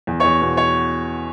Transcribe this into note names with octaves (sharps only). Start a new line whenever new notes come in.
E2
C#5 C#6
E2
B2
C#5 C#6